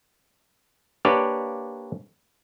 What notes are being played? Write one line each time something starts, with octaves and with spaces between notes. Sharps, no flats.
A#3 D4 G4 B4 C#5 D5